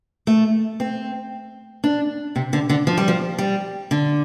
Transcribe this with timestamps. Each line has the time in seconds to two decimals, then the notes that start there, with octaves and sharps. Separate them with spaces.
0.27 A3
0.80 C4
1.84 D4
2.36 C3
2.53 D3
2.70 D3
2.87 F3
2.97 G3
3.08 F3
3.39 G3
3.91 D3